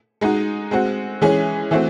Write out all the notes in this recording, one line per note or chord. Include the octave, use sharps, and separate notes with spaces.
G#3 D#4 F#4
G#3 C4 F#4
E3 G#3 C#4 G#4
E3 A3 C4 F#4